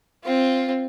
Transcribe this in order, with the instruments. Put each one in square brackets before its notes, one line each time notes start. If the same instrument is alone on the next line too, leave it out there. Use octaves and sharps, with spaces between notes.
[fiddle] C4 F4